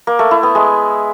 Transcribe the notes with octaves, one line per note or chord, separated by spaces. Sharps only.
A#3
A3
E4
B3
G#3